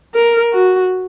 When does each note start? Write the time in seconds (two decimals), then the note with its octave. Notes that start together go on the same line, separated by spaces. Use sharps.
0.15 A#4
0.53 F#4